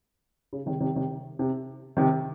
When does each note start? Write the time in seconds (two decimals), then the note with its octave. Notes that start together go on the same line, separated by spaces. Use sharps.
0.53 C#3
0.66 C3 D#3
0.80 C3 D#3
0.96 C3 D#3
1.39 C3
1.97 C3 D#3